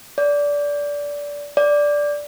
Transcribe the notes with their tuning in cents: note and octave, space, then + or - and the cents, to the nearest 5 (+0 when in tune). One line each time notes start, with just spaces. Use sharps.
D5 -20
D5 -5